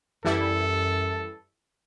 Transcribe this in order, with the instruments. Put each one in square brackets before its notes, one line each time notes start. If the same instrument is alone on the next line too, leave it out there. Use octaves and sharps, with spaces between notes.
[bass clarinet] F#2 [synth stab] E3 G3 E4 [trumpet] A4